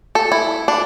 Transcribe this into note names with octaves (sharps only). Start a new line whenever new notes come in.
A4
E4
D4